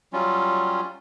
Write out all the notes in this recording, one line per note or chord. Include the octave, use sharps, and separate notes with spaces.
F#3 G3 C#4 F4